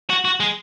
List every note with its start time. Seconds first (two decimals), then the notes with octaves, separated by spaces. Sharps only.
0.10 F#4
0.25 F#4
0.40 G#3